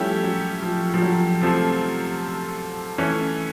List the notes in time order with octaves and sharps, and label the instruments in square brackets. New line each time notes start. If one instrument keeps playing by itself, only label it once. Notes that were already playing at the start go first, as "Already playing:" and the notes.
Already playing: [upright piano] F3 G3 [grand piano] A3 C#4 E4 G4
[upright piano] F#3
F3
F3
F#3
[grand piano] C3 F3 A3
E3 A3 C#4